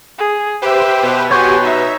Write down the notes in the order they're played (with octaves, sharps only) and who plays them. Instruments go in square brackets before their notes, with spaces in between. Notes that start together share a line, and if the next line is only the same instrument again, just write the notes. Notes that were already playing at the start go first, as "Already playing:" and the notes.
[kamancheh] G#4
[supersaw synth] G4 B4 C5 [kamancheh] E5 G5
[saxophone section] B2 B3
[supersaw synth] F#4 G4 [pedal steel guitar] C#5 C#6 G6 [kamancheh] G#5 C6
[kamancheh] D#4 [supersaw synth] E5